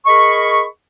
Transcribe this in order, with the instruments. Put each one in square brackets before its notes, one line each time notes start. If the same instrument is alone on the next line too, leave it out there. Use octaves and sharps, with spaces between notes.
[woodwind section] G#4 A#4 D#5 B5 C#6